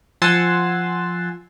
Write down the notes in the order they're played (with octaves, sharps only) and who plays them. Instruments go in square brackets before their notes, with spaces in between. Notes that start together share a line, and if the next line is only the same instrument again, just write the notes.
[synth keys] F3 F#5 G#5 C6 E6 A6